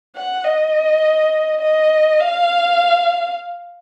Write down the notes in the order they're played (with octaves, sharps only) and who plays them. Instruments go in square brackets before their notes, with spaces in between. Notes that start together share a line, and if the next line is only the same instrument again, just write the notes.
[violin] F#5
D#5
D#5
F5